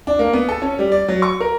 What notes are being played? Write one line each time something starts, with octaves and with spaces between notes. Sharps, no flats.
D4
A#3
B3
A4
C#4
G3
D5
F#3
C#6
A#4